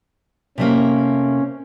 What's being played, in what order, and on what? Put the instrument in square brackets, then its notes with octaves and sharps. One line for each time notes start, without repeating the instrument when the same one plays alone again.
[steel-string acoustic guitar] C3 A3 A#3 [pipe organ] C#4